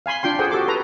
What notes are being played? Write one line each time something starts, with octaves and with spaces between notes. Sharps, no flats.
F5 G#5 B5 C6
D4 F4 G5 C6
G#4 A4 C5 F#5 G5
F#4 G4 A4 D6
A4 B4 A#5